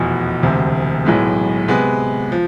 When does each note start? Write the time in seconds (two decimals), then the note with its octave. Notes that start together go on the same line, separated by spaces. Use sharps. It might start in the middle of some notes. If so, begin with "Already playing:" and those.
Already playing: F1 E2 B2
0.43 E1 D2 C3
1.05 B1 A2 G#3 B3
1.68 C3 G#3 B3
2.32 F3